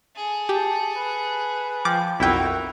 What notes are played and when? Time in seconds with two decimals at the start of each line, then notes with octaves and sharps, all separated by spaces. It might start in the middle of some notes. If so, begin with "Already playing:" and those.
0.16 G#4 A4
0.49 G4 A5
0.96 B4
1.85 F3 G5 D6
2.20 B1 F2 D#4 E4 F#4 A#4 G5